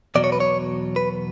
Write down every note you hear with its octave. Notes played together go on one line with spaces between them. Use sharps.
E2 B2 F#3 D5
C#5
B4
C#5
B4